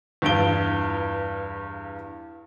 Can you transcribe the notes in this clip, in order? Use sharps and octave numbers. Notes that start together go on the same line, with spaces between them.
E2 G2 F4 D7 G7